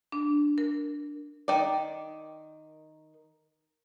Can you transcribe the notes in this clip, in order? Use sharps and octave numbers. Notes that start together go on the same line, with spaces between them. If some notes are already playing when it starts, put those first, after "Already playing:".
D4
A#4
D#3 D5